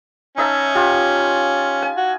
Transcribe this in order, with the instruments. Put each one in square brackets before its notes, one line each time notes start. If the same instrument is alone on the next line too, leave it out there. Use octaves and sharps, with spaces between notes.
[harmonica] C#4 [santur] D#4 E5 A5
[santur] F4 G4
G#5
[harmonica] F#4